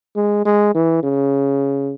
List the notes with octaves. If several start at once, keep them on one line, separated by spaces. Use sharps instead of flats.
G#3
G#3
E3
C#3